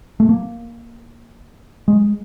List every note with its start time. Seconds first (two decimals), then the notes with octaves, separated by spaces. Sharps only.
0.20 A3
0.29 A#3
1.88 G#3